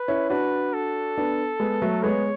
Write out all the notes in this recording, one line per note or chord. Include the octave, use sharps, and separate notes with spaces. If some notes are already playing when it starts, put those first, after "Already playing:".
Already playing: B4
C#4 E4
D4 F#4 B4
A4
B3 D4
G#3 B3
F#3 A3
G#3 B3 C#5